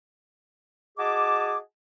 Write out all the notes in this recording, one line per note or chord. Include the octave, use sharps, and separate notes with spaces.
F#4 G#4 D#5 G#5 A5 D6